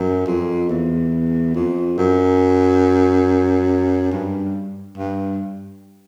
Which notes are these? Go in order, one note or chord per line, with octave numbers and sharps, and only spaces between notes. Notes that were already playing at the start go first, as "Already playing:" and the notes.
Already playing: F#2
F2
E2
F2
F#2
G2
G2